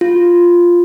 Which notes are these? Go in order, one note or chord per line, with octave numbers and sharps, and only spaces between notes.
F4